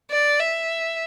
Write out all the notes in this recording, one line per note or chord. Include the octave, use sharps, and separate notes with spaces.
D5
E5